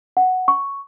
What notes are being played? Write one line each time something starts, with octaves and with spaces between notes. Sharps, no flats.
F#5
C#6